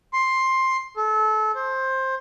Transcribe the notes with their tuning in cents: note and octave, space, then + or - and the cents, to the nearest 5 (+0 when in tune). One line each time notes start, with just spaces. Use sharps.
C6 +10
A4 -30
C5 +15